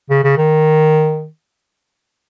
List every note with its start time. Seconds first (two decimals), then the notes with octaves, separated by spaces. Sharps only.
0.10 C#3
0.24 C#3
0.38 D#3